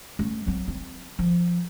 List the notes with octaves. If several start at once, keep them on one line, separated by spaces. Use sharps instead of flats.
A3 C#4
F#3 C4
C4
F3